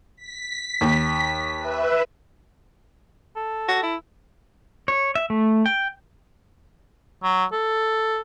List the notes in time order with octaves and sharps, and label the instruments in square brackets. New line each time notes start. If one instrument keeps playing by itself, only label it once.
[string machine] B6
[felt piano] D#2
[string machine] B4 E5
[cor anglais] A4
[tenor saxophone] F#4
E4
[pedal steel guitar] C#5
E5
A3
G5
[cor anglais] F#3
A4